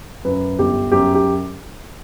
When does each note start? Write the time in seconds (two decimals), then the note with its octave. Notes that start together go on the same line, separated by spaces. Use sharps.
0.25 F#2 B4
0.59 G1 G4
0.92 F#2 G4
1.15 G4